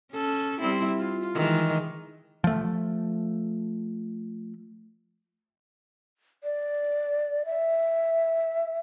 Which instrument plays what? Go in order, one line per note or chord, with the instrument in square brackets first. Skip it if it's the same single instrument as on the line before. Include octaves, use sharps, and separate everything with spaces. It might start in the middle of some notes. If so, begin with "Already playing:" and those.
[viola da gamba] C#4 A4
G3 C4 E4
F4
D#3 E3 G#3
[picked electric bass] F3 A3
[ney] D5
E5